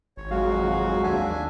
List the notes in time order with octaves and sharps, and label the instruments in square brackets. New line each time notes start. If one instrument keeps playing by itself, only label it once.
[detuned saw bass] G#1 [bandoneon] C#5
[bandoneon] F2 F#4 [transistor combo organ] F#3 G#3 [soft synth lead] F5
[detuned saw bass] D#2 [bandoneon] D4 E5 G#5